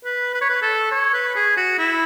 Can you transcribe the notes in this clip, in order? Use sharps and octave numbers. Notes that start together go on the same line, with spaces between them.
B4
B4
C#5
B4
A4
C#5
B4
G#4
F#4
E4